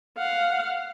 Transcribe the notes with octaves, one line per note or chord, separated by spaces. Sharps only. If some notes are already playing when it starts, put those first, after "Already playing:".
F5 F#5